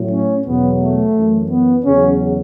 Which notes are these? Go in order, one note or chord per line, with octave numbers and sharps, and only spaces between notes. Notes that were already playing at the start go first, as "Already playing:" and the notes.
Already playing: A2 F#3
C#4
E2 B2 F#3 B3
A3
F#2 E3
B3
E2 C#3 F#3 C#4